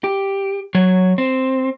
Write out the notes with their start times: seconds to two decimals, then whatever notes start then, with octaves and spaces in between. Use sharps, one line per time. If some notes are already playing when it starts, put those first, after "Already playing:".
0.04 G4
0.75 F#3 C#5
1.18 C4